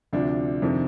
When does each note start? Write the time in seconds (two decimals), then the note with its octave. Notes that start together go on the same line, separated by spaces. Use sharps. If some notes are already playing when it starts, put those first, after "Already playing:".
0.13 D2 C3 F3 D4
0.62 F2 C3 D#3